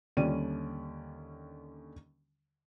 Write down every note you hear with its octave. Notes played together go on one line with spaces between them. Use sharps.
D#2 D3 G3 C#4 D5 D#7